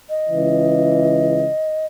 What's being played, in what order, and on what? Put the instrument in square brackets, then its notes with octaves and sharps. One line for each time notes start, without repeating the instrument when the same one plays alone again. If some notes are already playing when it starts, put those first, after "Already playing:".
[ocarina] D#5
[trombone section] C#2 C#3 E3